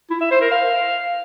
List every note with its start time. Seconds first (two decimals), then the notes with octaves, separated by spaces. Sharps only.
0.10 E4
0.21 E5
0.31 C5
0.41 A#4
0.52 F5